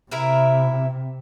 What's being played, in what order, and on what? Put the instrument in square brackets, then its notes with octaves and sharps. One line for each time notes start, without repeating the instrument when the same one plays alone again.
[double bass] C3 [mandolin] E4 A#4 E5